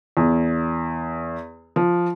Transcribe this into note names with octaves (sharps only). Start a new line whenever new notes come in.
E2
F3